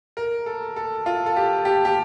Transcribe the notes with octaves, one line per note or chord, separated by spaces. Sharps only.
A#4
A4
A4
F4
A4
G4
G4
G4